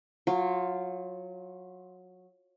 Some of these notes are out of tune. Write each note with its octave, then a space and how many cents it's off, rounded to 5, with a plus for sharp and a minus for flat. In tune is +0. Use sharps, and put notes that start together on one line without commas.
F#3 -20 F4 +0 G5 +35